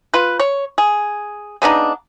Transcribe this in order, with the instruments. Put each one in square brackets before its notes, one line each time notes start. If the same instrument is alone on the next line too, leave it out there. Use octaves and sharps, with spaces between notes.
[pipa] F4 B4
C#5
G#4
C#3 B3 D4 D#4